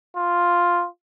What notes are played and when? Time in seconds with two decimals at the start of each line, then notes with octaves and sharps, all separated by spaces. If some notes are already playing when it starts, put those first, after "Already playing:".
0.17 F4